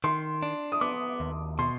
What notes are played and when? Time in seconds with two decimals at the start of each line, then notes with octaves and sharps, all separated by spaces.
0.04 D#3 C6
0.43 D4
0.72 D#6
0.81 B3 D6
1.20 D#2
1.59 B2 C6